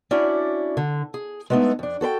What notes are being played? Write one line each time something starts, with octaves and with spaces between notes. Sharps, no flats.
C#4 D4 E4 F#4 D5
D3
G#4
G#3 A3 B3 D4 D#4 E5
F2 D4
F#4 A4 B4 G5